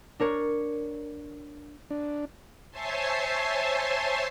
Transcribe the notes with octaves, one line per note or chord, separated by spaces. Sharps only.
D4 A#4 C#5
D4
C5 C#5 E5 G#5 A5 C6